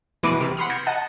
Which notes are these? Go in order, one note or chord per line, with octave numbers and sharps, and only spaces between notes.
B2 E3 B4 D6 A#6 D#7
C3 F6 D7
F#5 B5 C6 D#6 F6
G6 G#6 A#6 C#7 D7 E7
D#5 F#5 A5 D#6